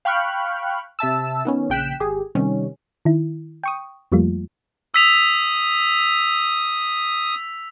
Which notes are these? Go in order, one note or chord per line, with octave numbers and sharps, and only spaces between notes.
F5 G5 B5 C#6 F6 F#6
C3 E5 A5 E6
D#3 B3 C#4
A#1 C#3 G5 F#6 B6 E7
G#1 G4 G#4
C3 D#3 G3 C#4
D#3 E4
G5 C#6 D#6
F2 F3 G3 A3 A#3 F4
D#6 E6 B6 F7